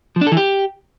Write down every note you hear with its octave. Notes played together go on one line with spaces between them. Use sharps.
F3
D4
A4
E3
G4